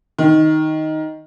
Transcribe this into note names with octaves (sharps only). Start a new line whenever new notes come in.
D#3